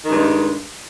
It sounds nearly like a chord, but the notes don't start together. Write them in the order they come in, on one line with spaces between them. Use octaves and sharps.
D#3 G#3 G2